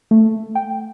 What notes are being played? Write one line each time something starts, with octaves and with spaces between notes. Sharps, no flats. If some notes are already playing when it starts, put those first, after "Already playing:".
A3
G5